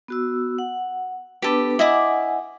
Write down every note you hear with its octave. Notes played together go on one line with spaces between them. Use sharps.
B3 F#4 E6
F#5
B3 D4 G4 A4 B4
E4 D#5 F#5 G#5 D6